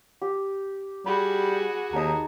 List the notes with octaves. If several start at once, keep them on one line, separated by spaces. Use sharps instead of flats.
G4
G3 F#4 G#4 B5
D#2 D#4 A5 A#5